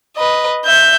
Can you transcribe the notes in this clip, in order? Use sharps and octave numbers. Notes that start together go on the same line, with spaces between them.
B4 D#5
E5 G6